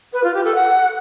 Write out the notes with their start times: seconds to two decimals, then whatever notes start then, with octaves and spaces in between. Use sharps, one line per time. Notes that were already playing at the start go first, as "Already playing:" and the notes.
0.13 B4
0.24 F4
0.34 G4
0.44 A4
0.55 F#5